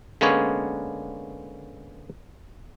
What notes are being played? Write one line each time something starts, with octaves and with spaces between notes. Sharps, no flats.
D3 G#3 A#3 B3 C#4 C#5